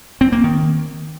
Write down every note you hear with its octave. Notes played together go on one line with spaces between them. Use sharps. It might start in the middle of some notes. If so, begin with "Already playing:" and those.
C4
A#3
D#3